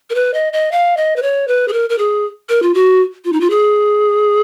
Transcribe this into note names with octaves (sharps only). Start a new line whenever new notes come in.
A#4
B4
D#5
D#5
F5
D#5
B4
C#5
B4
G#4
A#4
A#4
G#4
A#4
F4
F#4
F4
D#4
F4
G#4